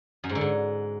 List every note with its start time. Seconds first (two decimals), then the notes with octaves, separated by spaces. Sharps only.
0.24 F#2
0.29 G#2
0.35 D3
0.41 G#2